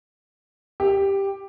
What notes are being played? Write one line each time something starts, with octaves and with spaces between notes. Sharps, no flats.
G4